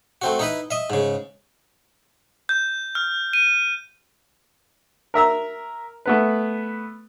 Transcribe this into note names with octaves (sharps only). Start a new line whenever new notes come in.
A3 C4 F#4
D#4 E4 B4
D#5 E5
G#2 C#3
G6
F6
D#7
A#4 E5 A#5 E6
A3 B3 B4